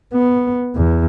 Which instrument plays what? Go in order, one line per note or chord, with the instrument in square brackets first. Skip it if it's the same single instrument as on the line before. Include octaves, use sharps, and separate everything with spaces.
[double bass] B3
E2